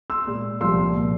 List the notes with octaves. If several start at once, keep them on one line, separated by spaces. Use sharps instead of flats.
C6 E6
A#2 G#3
C2 A#2 F3 C6 E6
A#2 F3